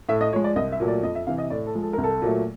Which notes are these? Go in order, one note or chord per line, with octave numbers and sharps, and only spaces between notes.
A2 E5
D#5
F3 G#3 C#5
D5
C2 D#5
E5
A#2 F#3 A3
D5
F2 D#5
E5
C3 E3 F5
D#5
A2 D5
A4
F3 G#3
A4
C2 A#4
A4
A#2 F#3 A3